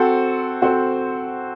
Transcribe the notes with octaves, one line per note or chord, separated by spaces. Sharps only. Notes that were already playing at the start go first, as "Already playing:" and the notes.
Already playing: C4 F#4 A4 C5
C4 F#4 A4 C5